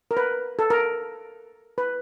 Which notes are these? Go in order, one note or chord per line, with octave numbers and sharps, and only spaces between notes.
A#4
B4
A4
A#4
B4